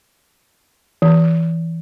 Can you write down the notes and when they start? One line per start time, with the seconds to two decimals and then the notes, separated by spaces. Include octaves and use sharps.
1.02 E3